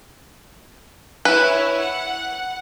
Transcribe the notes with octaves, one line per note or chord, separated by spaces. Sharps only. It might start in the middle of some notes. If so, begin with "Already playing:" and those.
E4 B4 C#5
F#5